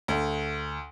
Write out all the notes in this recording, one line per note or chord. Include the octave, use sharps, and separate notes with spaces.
D2